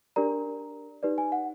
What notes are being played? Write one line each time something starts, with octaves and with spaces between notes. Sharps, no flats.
D4 G4 A#4 D5 A#5
D#4 G4 B4 D5
G#5
F#5